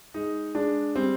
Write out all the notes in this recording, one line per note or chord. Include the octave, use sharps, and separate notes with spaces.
G#3 D#4
G#3 D4
G3 C4